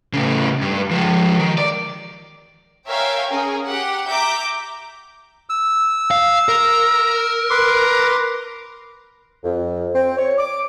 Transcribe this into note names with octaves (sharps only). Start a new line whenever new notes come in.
A2 C#3
G2
F3 G#3
D#3
D5
A#4 C#5 E5 F5 G5 G#5
C#4 G#4 A#4
G4 F#5
E5 A#5 D6 G6
E6
F5
A#4
B4 C6 D6
F2
C4
C#5
D6